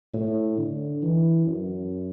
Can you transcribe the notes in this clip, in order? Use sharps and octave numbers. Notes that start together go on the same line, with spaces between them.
A2
D3
E3
F#2